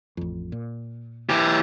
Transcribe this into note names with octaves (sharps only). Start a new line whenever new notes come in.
A1 F2
A#2
E3 G4